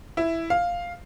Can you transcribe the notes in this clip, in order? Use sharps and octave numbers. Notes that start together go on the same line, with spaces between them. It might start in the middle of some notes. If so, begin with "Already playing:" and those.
E4
F5